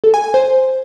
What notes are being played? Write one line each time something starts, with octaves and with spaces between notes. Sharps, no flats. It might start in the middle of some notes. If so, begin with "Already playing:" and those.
A4
G#5
G#5
C5